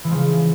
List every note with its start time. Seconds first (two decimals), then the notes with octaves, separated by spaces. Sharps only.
0.04 E3
0.08 G#3
0.11 F3
0.15 C#3